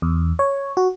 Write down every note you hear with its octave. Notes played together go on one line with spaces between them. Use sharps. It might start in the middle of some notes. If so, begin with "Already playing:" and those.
E2
C#5
F#4